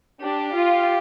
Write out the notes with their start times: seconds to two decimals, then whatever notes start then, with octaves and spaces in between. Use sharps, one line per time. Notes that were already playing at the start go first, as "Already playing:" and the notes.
0.22 D4 G4
0.55 F4